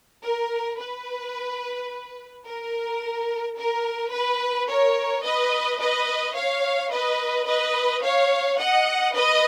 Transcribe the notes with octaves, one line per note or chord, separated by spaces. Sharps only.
A#4
B4
A#4
A#4
B4
A#4 C#5
B4 D#5
B4 D#5
C#5 F5
B4 D#5
B4 D#5
C#5 F5
D#5 F#5
B4 D#5